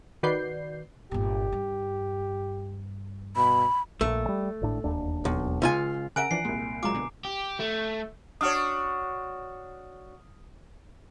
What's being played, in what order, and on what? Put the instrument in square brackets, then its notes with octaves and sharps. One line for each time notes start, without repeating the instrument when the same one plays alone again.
[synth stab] D#3 F#4 B4 D5 G6 C7
[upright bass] G1 A#2 [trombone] G4
[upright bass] G2
[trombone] B2 [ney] B5
[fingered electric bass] A#1 A#2 [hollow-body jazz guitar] A3
[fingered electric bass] G3
G#1 A2 D4
E1 D#2 D4
[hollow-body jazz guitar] B1
C#2 F4 G#5
[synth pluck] C#3 A#4 E5 [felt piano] F#5 A#5 F#6 [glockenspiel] G#5 D7
[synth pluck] E3 F3 D4 [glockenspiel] C7
[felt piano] C2 A#2 [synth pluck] G#3
[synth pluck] F#3 G#3 F4 [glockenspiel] A#5 D6
[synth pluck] B2 D3
[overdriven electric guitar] G4
A3
[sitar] D4 F#4 C#5 [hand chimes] D#6 F6